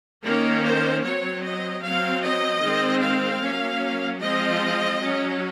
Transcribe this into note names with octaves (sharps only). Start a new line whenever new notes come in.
D#3 A#3 C#4 A#4
C5
F#3 C4 C#5
D#5
F#3 C4 F5
D#5
D#3 G#3 C4
F5
F#3 A#3 C#4
F3 G#3 C4 D#5
F#3 C#4